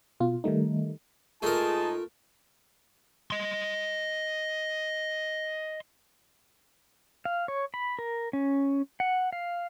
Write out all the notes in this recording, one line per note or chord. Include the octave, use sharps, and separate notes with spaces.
B2 F4
D#3 G3 A3 D#4
G#2 A3 D#4 F4 G#4 A#4 A5
D#5 C6
F5
C#5
B5
A#4
C#4
F#5
F5